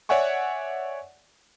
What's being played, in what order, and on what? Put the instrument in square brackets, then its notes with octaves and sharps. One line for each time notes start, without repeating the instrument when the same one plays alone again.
[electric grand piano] C#5 D5 E5 F#5 G#5 C#6